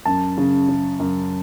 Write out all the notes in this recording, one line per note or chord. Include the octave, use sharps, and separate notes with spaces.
F#2 A5
C#3
C#3
F#2